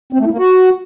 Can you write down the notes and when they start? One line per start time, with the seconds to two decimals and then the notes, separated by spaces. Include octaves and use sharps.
0.13 C4
0.19 A3
0.25 E4
0.32 A#3
0.38 F#4